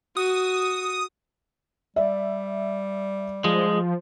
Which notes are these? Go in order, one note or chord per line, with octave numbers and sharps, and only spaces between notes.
F#4 D#6
G3 D5 E5
F3 G#3